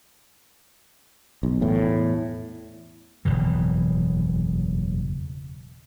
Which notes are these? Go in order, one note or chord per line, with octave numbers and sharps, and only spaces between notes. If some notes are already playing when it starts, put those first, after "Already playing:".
B1
E2 A2
F#1 E2 B2 E3